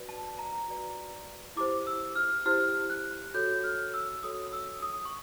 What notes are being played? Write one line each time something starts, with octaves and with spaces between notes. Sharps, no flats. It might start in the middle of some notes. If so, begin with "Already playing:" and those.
Already playing: F#4 B4 D5
A5
A#5
F#4 B4 D5
E4 G4 C5 D6
E6
F6
E4 G4 C5 F6
F#6
F#4 A4 C#5 G6
F6
E6
F#4 A4 C#5 D#6
E6
D#6
C#6